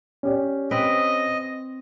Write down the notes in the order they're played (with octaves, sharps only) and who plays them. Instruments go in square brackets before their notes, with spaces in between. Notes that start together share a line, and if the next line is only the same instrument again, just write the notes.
[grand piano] C#4 G4 D5
[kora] C4 B4 [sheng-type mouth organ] D#5